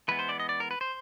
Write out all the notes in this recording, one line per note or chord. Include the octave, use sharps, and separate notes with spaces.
E3 G#3 B3 B4
C5
D5
D#5
D5
A#4
B4
C5